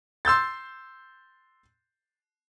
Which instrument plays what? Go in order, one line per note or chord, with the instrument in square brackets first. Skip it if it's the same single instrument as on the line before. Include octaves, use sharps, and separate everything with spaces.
[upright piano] C6 E6 G6 A6